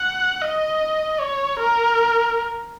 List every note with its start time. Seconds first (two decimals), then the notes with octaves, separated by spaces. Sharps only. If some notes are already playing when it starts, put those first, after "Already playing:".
Already playing: F#5
0.42 D#5
1.20 C#5
1.60 A#4